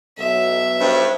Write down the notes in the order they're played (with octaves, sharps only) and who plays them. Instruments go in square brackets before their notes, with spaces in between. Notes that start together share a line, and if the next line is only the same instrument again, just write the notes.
[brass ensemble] B1 [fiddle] E5
[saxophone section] G2 [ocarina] C5